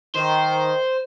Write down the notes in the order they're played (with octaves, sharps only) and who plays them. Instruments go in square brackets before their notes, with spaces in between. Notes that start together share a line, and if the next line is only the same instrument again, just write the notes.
[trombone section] D#3 [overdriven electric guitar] C5